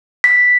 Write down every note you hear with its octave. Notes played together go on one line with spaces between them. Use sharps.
B6